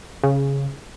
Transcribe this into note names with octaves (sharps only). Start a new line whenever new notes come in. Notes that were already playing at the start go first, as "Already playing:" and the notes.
C#3